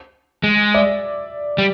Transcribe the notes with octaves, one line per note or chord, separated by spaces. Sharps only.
G#3
D5 E5
G3